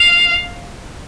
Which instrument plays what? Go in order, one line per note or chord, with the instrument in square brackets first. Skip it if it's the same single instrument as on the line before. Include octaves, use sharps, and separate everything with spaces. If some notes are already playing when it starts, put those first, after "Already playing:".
Already playing: [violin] F5